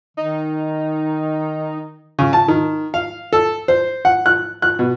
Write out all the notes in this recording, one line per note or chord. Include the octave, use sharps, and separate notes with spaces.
D#3 D#4
C#3
A5
D#3
F5
A4
C5
F#5
F#6
F#6
B2